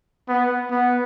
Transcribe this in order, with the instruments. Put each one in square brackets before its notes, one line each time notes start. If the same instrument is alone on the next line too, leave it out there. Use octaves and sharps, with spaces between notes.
[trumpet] B3
B3